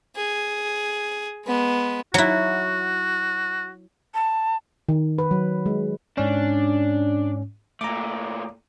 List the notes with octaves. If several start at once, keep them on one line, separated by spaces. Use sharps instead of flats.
G#4
G#3 B3
F#3 E4 F#4
A5
D#3
B4
F#3
G#3
G#2 C#4 D4
A#2 A3 A#5 D6